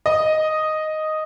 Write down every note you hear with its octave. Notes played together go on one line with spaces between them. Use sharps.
D#5